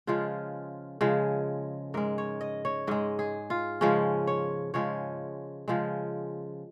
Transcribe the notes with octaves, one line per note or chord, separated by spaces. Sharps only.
C#3 F3 G#3 F4
C#3 F3 G#3
G#2 G#3 A#4
C#5
D#5
C#5
G#2 G#3 D#5
G#4
F4
C#3 F3 G#3 C#4
C#5
C#3 F3 G#3 C#5
C#3 F3 G#3